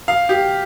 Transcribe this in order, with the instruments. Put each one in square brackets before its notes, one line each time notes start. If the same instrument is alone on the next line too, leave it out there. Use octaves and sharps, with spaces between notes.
[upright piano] F5
G4